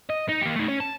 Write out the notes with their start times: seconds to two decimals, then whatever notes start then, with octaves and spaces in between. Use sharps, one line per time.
0.10 D#5
0.29 D#4
0.42 A#3 G4
0.56 A3 D#4
0.68 C#4 C#5
0.80 A5